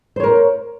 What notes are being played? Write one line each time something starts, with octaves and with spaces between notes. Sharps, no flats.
A#4 C5 C#5